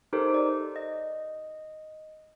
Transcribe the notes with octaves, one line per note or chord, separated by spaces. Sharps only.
D#4 G4 A4 A#4 C5
D5
D#5